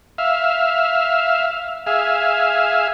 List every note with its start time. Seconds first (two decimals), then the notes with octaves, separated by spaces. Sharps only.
0.18 E5 F5
1.87 G#4 E5 F5